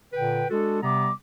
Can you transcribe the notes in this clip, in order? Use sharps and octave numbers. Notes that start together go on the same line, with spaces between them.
A#2 D3 B4 G5
G#3 D4 F#4 A4
C3 G3 B3 A#5 D6